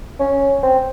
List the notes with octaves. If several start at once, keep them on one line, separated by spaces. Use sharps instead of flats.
C#4
C4